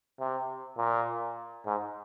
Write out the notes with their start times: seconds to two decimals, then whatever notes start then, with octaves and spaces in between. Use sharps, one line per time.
0.19 C3
0.78 A#2
1.66 G#2